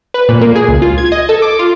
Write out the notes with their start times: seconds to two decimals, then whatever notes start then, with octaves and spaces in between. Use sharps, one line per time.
0.14 B4
0.29 A#2
0.41 A#3
0.55 G#4
0.69 C#2
0.82 F4
0.98 G#6
1.12 D#5
1.29 A4
1.42 D6
1.59 F4